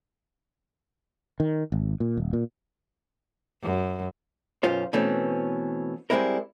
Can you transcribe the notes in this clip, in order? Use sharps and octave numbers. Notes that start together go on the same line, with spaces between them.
D#3
G#1
A#2
D#1
A#2
F#2
B1 F#2 C#4 F4 C5
B2 E3 A3 C4 C#4
G3 G#3 C4 D4 E4 A#4